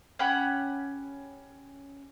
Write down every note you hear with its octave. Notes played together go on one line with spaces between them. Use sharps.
C#4 G4 F#5 B5